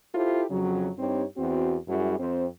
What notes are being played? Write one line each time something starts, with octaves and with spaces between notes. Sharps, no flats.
E4 F4 G4 A4 C5
F2 C#3 F#3
G2 C4 D#4 G4 C#5
E2 C4 F#4
F#2 F#3 G3 E4 G#4
F2 C4 C5